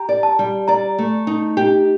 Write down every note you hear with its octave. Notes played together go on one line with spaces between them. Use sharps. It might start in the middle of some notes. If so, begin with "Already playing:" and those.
Already playing: G4 A#5
D5
A5
G3
D5 A#5
A3
D#4
G4